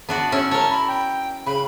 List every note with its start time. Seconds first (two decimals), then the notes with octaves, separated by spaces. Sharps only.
0.09 B3 D4 F#4
0.32 C#4 E4
0.51 A#4 C#5 A5
0.70 B5
0.88 G5
1.46 C#3 B5